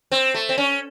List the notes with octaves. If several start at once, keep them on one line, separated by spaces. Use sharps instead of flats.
C4
A3
C4
C#4